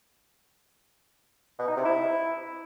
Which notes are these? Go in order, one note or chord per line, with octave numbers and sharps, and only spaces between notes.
B2
D#4
C3
E4